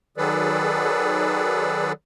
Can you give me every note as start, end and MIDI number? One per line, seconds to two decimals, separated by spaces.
0.17 1.92 51
0.17 1.92 54
0.17 1.92 68
0.17 1.92 69
0.17 1.92 71
0.17 1.92 74